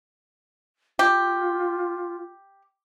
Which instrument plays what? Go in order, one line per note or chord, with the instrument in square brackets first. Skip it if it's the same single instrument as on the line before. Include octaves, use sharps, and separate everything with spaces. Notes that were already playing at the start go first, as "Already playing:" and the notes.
[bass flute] F4 [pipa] G4